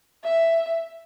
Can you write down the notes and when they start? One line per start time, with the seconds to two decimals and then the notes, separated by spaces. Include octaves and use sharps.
0.24 E5